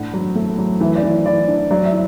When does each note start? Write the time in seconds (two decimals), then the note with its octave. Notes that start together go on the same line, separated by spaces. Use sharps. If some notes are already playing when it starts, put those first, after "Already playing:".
Already playing: A2 D4 F#5
0.14 F#3
0.35 A3
0.58 F#3
0.81 E3 E5
0.95 D5
1.03 E3
1.11 D5
1.26 E3 D5
1.48 D4
1.71 F#3 D5
1.85 E5
1.92 E4